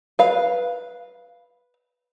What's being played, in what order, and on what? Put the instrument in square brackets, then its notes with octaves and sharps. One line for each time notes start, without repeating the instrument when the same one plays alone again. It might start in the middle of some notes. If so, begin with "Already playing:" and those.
[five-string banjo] B4 F5